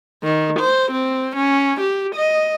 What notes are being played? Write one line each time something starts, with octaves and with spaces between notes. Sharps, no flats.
D#3
C5
C4
C#4
G4
D#5